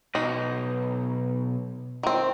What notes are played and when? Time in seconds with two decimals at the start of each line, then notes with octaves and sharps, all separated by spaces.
0.15 B1 D#4
2.03 D#3 C4